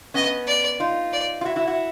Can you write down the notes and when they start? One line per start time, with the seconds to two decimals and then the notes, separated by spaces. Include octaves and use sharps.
0.14 B3 C#4 D#5
0.47 D5
0.80 D#4 F4
1.13 D5
1.41 F4
1.45 E4 F#4
1.56 E4 F#4
1.67 E4 F#4